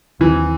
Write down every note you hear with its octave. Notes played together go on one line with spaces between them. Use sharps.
D#2 D#3 E3 F#3 C4